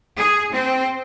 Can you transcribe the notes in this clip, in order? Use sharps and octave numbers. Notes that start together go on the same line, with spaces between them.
G#4
C4